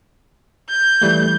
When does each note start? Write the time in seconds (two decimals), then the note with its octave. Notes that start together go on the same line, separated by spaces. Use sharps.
0.69 G6
1.02 E3 G3 A3